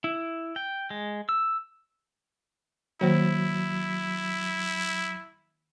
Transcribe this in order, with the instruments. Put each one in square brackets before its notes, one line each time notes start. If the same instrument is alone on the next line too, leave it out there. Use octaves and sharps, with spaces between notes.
[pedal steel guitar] E4
G5
G#3
E6
[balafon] D#3 A#3 C5 [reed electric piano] F#3 [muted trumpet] E4